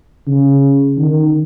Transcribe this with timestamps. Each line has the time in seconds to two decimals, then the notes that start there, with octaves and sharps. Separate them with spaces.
0.27 C#3
0.98 D#3